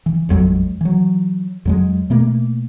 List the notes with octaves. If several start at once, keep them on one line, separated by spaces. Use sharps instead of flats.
E3
A1 F2 F#3 G#3
E3 F#3
F2 F#3 G#3
B2 A3 A#3